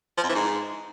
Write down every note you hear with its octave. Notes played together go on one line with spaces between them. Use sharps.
F3
F2
E3
G#2